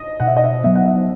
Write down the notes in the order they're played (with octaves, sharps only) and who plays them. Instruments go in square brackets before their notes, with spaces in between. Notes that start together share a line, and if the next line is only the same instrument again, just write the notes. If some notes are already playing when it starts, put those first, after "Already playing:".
Already playing: [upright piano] D#5
[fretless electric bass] B2 [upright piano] F#5
[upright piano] E5
D#5
E5
[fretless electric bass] F#3 B3 [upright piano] E5
[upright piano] F#5
E5